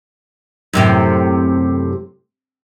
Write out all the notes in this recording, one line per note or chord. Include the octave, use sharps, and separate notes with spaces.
F#2 A2 C3